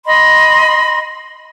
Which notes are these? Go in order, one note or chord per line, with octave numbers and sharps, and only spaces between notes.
D#5 B5 C6